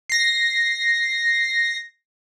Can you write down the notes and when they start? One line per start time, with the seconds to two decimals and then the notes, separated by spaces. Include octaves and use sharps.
0.09 A#6 C7